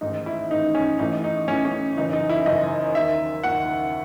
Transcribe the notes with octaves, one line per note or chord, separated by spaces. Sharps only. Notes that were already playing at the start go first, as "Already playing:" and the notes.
A1 G#2 D#3 D#4
E4
A1 G#2 D#3 D#4
C#4
A1 A2 E3 D#4
D#4
A1 A2 E3 C#4
C#4
F#1 F#2 E3 D#4
D#4
E4
F#1 F#2 E3 D#5
D#2 D#3 E5
D#2 D#3 F#5